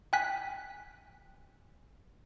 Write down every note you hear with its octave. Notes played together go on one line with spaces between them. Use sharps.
G5 G#5 F#6 B6